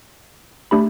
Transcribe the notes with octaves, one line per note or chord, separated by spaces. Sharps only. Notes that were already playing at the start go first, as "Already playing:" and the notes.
A3 D4 G4 B5